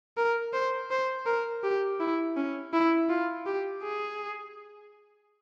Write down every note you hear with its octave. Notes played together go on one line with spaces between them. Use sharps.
A#4
C5
C5
A#4
G4
E4
C#4
E4
F4
G4
G#4